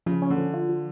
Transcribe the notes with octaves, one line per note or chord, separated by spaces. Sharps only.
C#3 F3
C#4
D3
F3
F4
F3